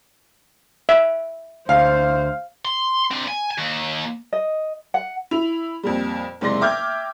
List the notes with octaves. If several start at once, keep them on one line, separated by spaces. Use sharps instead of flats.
E5
D2 C5 F5
C6
D3 C4
G#5
D#2
D#5
F#5
E4 F7
F2 A#2 G3
F#1 G#2 C3 D5 C6 A#6
E5 G5 D6 F6 G6 G#6